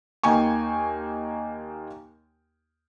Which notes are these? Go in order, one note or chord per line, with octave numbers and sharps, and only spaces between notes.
D#2 A#3 D#4 G5 G#5 C#6